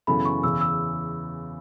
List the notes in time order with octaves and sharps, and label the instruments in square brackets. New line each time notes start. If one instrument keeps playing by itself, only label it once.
[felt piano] F#2 C#3 E3 B3 A4 [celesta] B5
[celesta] C#6
[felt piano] E2 C#3 E3 [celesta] E6
[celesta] E6